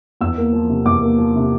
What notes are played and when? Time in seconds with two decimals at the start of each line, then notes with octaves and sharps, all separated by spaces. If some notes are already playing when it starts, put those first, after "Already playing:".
0.21 E2 E6
0.37 A#3
0.53 F3
0.69 C3
0.85 E2 D6
1.02 A#3
1.18 F3
1.36 C3